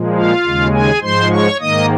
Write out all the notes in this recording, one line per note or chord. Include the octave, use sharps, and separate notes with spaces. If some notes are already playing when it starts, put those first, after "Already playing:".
Already playing: A#2 F3 G#3
F4 F5
D#2 C#3 G#3
G#4 G#5
G#2 F3 G#3 C5 C6
C#5 C#6
G#2 D#3 A#3 D#5 D#6